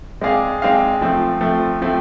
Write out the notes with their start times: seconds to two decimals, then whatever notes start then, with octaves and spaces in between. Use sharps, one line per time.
0.21 G#3 C4 G#4 D5 F5
0.62 G#3 C4 G#4 D5 F5
1.01 F3 A3 C4
1.41 F3 A3 C4
1.81 F3 A3 C4